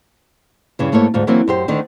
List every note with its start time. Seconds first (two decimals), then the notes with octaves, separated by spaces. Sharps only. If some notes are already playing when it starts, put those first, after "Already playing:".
0.79 G2 C#3 E3
0.92 G#2 A3 A#3 E4 C#5
1.14 D2 G#2 F4
1.27 E3 F#3 A#3 C4
1.48 F#2 G4 C5
1.68 D2 D3 D#3